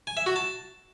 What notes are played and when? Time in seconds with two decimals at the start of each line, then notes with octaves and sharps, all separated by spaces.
0.07 G#5
0.17 E5
0.26 F#4
0.36 A5